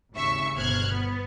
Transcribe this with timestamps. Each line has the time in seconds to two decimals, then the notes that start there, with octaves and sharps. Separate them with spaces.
0.14 G#1 D#2 C#3 E5 C#6
0.54 G1 B2 C5 F6 F#6 G#6
0.90 B3